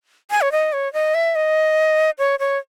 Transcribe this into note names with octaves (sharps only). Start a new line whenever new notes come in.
G#5
C#5
D#5
C#5
D#5
E5
D#5
C#5
C#5